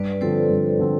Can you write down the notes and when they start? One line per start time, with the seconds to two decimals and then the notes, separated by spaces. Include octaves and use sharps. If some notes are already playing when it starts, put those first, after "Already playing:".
Already playing: G2 B4 D5
0.21 D3 F3 C4 A4 C5
0.50 G2
0.79 D3 F3 C4